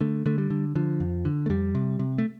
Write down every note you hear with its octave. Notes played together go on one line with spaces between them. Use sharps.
D3 A3
D3 A3
G3
D3
D3 F3
F2
D3
A3
F2 G3
C3
C3
A3